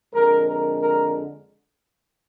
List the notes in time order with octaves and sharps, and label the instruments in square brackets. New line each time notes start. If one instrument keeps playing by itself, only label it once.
[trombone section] F2 D3 G#3 A#4
A#4
A#4